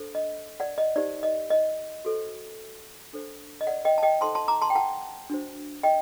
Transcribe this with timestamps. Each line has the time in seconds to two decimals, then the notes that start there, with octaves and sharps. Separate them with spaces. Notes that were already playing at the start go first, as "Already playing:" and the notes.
Already playing: D4 A4 C5
0.15 D#5
0.60 D5 F#5
0.78 D#5
0.96 D#4 G4 C5 D5
1.23 D#5
1.50 D#5
2.05 F#4 A4 C5
3.13 D4 A4 C5
3.61 D#5
3.67 D5 F#5
3.85 D#5 G5
3.98 A5
4.03 D#5 G5
4.21 D#4 A4 C5 A5 C6
4.35 A5 C6
4.48 A#5 D6
4.62 A5 C6
4.70 G5
4.75 F#5 A5
5.30 D4 F#4 C5
5.83 D#5 G5